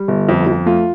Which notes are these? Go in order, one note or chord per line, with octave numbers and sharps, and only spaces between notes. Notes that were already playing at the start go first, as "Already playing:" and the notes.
Already playing: G3
G1
F2
F2
A3 F4